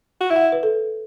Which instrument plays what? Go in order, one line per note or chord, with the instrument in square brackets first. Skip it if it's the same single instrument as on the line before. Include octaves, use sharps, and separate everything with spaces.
[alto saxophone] F#4
[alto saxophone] E4 [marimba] E5
[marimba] F#5
E5
B4
A4